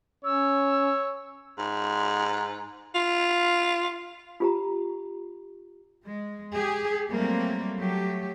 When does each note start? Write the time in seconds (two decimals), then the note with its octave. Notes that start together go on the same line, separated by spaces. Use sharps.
0.25 C#4 C#5 E6
1.58 G#2
2.95 F4
4.40 F4 G4 A#5
6.04 G#3
6.52 G4 G#4
7.09 F#3 G3 A3 A#3 C4
7.78 F#3 A3 G4